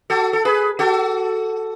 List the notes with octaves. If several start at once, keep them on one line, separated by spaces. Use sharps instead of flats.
F#4 A4
A4
G#4 B4
F#4 A4